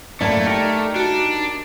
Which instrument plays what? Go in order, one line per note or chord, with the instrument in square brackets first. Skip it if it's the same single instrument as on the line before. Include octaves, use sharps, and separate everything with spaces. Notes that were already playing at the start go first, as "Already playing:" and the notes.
[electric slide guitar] F#2 A2 A#3 [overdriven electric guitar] A3 [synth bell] D5 G#6
[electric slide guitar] D#4 G4 A#4
[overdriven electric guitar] D4 [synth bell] F#4